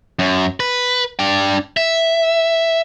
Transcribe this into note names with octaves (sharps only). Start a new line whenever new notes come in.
F#2
B4
D4 G5
E5